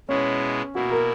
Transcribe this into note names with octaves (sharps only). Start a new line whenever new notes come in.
B2 G#3 B3 C#4 E4 G#4
B2 A#3 E4 F#4
A#4